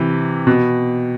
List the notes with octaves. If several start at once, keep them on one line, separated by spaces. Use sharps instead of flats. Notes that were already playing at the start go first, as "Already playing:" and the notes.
Already playing: C3 E3
B2